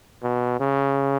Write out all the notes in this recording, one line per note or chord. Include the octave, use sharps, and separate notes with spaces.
B2
C#3